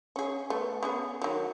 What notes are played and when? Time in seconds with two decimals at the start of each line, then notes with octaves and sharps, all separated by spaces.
0.16 C#4 G#4
0.50 A3 B3
0.83 B3 C#4 G#4
1.22 D#3 F#3